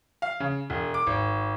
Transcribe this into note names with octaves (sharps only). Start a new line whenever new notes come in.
F5
C#3
E1
D6
G#1